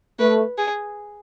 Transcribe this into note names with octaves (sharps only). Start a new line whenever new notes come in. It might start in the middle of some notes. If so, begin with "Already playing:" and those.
A3 B4
G#4